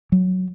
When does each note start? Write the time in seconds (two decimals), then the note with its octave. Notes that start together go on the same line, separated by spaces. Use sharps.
0.12 F#3